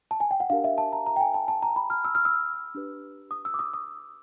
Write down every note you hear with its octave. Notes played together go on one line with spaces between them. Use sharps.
A5
G#5
G5
F#5
D4 G4 A#4 F5
E5
A5
A#5
A#5
G5
G#5
A5
A5
A#5
B5
F6
E6
F6
E6
D4 G4 B4
D#6
E6
D6
D#6
D#6